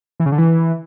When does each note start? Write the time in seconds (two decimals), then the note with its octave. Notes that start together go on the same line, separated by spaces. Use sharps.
0.20 E3
0.26 C#3
0.32 D3
0.38 E3